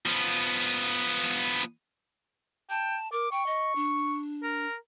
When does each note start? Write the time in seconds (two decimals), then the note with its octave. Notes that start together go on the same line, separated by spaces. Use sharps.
0.06 F3 B3
2.70 G5 A5
3.12 A#4 D6
3.32 G5 C#6
3.47 D#5
3.76 D4
4.43 A#4